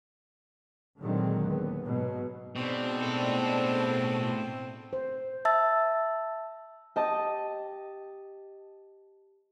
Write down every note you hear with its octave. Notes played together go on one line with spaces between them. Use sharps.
A#2 D3 D#3 F#3 G#3 C4
D#2 B3
G#2 B2 F#3
G#2 B2 C4 D4
A2 A4
C5
E5 A5 E6 A6
G4 D#5 A5